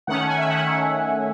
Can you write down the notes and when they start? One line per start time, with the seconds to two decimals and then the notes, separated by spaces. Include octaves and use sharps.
0.07 D#3 A3 C#4 F#5
0.27 G#5
0.38 E5
0.46 D#3 A3 C#4 F#5
0.56 F#5